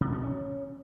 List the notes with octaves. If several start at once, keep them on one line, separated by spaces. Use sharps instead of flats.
C3
B2
C#4